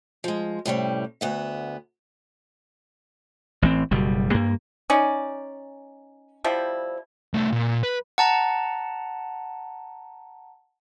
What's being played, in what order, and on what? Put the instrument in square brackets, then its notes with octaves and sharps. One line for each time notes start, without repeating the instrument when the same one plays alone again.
[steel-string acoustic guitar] F3 G#3
A2 C3 G3 C#4
D2 B3 E5
[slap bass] A1 E3 C4
F#1 B2 G3
G2 A#3
[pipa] C#4 D#4 D5
F3 G3 E4
[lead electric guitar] C2 A3
A#2
B4
[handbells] F#5 A5 A#5